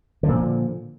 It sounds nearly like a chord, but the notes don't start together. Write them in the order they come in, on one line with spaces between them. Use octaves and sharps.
D3 F3 A#2